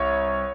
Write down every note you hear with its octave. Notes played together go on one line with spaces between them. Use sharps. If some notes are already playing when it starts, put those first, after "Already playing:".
Already playing: C2 C#5